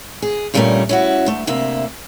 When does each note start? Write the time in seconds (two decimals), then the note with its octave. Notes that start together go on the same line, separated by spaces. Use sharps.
0.22 G#4
0.54 G2 A#2 G3 A3 C#4 A#4
0.89 C#4 E4 F#4
1.26 D2 A3
1.47 D2 C3 A#3 E5